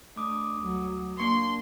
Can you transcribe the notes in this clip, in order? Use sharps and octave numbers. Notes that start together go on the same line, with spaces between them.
A3 D4 D6 D#6
D2 F#3
A#3 D4 C6 C#6